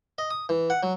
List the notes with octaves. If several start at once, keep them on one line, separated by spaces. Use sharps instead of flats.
D#5
D#6
E3
F#5
F#3